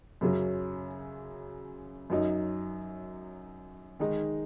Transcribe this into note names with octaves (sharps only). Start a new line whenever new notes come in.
F#2 C#3 F#3 C#4
F#2 F#3 D#4
D#3 G#3 D#4